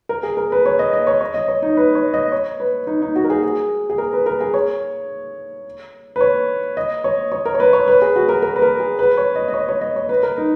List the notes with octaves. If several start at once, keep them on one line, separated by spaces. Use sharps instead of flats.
A#4
G#4
A#4
B4
C#5
D#5
D#5
C#5
C#5
D#5
C#5
D#4
B4
C#5
D#5
C#5
B4
D#4
D#4
F#4
A#4
G#4
G#4
G#4
A#4
B4
A#4
G#4
C#5
B4
C#5
D#5
C#5
C#5
A#4
C#5
B4
C#5
B4
G#4
F#4
A#4
A#4
B4
A#4
G#4
B4
C#5
D#5
D#5
C#5
C#5
D#5
C#5
B4
A#4
D#4